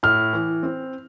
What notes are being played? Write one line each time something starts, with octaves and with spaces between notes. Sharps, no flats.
A2 F6
E3
C4